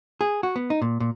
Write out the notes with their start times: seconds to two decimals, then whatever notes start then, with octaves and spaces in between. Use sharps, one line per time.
0.21 G#4
0.43 F#4
0.56 B3
0.70 D#4
0.82 A#2
1.00 A#2